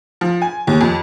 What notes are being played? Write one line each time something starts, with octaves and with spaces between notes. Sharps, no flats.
F3
G#5
D#2
F2